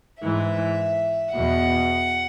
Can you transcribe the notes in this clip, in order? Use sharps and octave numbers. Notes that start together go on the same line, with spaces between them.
G#2 E3 E5
E2 B2 F#5